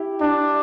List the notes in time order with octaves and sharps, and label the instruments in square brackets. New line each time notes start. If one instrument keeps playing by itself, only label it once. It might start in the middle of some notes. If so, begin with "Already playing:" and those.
Already playing: [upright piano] E4 G4
[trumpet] D4